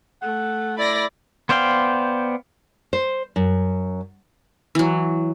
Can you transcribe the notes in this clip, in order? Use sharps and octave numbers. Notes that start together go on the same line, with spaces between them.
A3 F#5
E4 D5 B5 A#6
B3 C5 D5 F5 G5
C5
F#2
E3 F#3